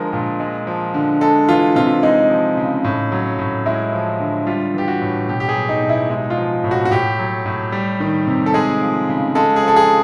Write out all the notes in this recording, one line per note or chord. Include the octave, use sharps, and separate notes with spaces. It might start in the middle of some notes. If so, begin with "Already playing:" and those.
Already playing: D3 F3 G#3 A#4
A#2
G#3
F3
D3
G#3 A4
E3 F4
C3 F4
G#3 D#4
F3
C#3
A2
F#3
A2
G#3 E4
F3
D3
G3 F4
E3 G4
F#4
A2
B2 G4
G4
G#4
F#3
D#4
B2
E4
G#3 D#4
F4
F3
A2
F#4
F#4
A2 G4
F#3
A2
G3
D#3
C3
A4
G#3 G#4
F3
C#3
G#3 A4
G#4
F3 A4
G#4